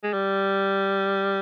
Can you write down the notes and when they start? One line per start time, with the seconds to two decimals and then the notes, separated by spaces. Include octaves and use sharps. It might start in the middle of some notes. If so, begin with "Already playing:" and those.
0.03 G#3
0.13 G3